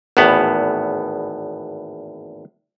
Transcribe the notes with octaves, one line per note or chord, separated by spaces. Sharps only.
G#1 E2 A2 B3